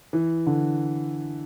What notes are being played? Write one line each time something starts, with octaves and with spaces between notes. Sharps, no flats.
E3
D3